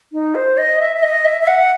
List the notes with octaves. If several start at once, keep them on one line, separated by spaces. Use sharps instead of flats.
D#4
C5
D#5
E5
E5
D#5
E5
E5
F#5